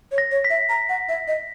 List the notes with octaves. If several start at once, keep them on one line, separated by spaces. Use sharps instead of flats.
C#5
A#6
C#5
B6
E5
A#5
F#5
E5
D#5